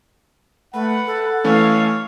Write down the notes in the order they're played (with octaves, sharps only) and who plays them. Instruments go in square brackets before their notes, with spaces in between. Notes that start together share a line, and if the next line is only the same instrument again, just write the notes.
[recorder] A3 [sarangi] B4 [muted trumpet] F#5
[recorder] A4
[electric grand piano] E3 A3 C#4 [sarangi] C#5 [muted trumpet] F5